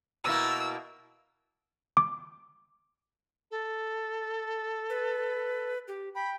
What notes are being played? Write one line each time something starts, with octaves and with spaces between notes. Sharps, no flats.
B2 A#3 E4 E6
D6
A4
B4
G4
G5 B5